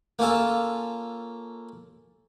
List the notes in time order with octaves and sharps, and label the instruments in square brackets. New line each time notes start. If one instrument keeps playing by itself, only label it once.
[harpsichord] A#3 C#4 F4 A4